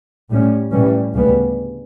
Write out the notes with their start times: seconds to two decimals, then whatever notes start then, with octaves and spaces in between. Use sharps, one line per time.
0.30 A2 G3 C#4
0.71 A2 E3 G3 C#4
1.13 D2 C#3 G3 B3